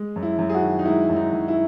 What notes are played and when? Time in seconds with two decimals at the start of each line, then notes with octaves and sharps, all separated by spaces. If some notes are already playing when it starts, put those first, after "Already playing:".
Already playing: G#3
0.16 F#2
0.23 E4
0.39 F#2
0.49 G#4
0.54 F#4
0.62 D#3
0.79 D#4
0.85 G#3 E4
1.09 F#2
1.16 D#4
1.33 F#2
1.48 E4